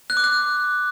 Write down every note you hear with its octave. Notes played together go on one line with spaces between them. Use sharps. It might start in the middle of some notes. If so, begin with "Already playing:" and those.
F#6
D6
F#6